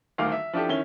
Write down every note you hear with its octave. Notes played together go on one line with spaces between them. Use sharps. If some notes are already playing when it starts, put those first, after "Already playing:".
D#1 D2 D#3 F5 D6 F6
E5
F3 D4 E4 G4 A4
D#3 C#4 E4 G7